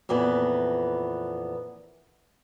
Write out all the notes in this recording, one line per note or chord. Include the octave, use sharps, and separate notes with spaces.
F2 A#2 E3 B3